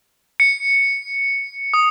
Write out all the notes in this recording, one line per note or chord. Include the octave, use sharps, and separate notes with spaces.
C#7
D#6